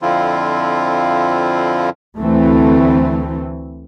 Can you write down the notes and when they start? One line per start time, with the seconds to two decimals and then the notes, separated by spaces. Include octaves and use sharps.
0.02 F2 D3 F3 C4 E4 F4
2.17 D2 E3 A3 C4